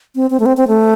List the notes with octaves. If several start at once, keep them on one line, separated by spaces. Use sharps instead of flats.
C4
C4
A3
C4
C4
A3